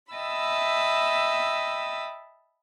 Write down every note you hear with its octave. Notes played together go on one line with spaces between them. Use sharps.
D#5 E5 G5 A5 B5 E6